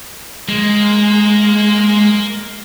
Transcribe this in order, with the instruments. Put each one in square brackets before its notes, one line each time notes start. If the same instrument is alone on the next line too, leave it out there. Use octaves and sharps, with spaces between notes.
[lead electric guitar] G#3 [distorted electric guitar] A#3